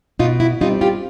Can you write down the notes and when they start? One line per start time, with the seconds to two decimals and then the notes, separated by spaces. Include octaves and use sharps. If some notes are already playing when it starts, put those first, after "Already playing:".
0.19 B2 D#4 F4
0.40 E4
0.61 G3 D#4 F4
0.64 C4
0.81 F4 G4